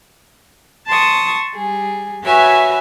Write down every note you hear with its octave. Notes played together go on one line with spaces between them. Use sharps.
A5 C6 C#6 D#6
G3 G#4
F#4 B4 C#5 E5 G#5